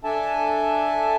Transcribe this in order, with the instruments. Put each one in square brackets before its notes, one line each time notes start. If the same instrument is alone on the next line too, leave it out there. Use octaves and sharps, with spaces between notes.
[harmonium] D4 A4 E5 G#5 A5